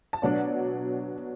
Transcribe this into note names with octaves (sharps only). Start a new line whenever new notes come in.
A5
B2 F#3 D4 D5 F#5